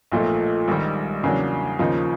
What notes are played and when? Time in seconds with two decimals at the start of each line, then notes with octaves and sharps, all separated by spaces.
0.12 B1 A#2 F3 A3
0.68 A#1 G#2 D#3 G3
1.23 E2 C#3 F#3 A#3 D4
1.79 D#2 C#3 F3 A#3 D#4